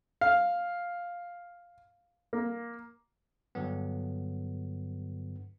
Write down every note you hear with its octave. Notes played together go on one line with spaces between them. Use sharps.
F5
A#3
G2 D3 F#3 B3